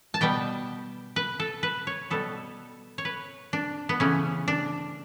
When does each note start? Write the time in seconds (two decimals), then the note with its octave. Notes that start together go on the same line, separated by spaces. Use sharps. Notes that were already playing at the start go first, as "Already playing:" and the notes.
0.14 A5
0.21 B2 G3 B3 G5
1.16 B4
1.40 A4
1.63 B4
1.87 C#5
2.10 B2 G3 B3 A4
2.98 C#5
3.05 B4
3.53 D4
3.89 B3
4.00 C#3 E3 A3 C#4
4.48 D4